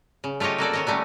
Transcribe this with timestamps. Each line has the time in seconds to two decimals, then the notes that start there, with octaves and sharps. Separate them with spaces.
0.24 C#3
0.40 A3 F4 G4 C#5 D#5
0.58 A#3 F#4 A4 D5
0.73 D#3 C#5 D#5
0.87 F#3 G3 A3 C#4